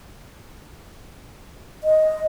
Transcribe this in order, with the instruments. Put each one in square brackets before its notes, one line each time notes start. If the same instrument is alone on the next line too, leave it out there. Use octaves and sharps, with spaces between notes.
[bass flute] D#5